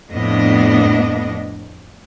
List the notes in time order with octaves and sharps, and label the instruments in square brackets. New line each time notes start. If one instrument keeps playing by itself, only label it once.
[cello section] F2 A2 B3 D4 D#5